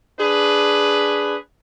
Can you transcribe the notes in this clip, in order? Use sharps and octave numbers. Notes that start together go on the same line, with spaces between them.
D4 G#4 B4